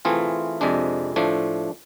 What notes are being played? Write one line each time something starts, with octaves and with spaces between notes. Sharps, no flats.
E3 A3 C4 F4 G#4
F2 C3 G#3 D4
A2 F3 A3 D4